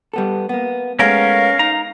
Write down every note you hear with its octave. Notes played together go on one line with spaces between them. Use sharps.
G3 B3 A4
A#3 B3
G#3 A3 B3 C#4 A#4 F5
D#4 A#5